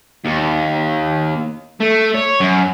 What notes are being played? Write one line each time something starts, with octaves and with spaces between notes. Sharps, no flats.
D#2
A3
C#5
F#2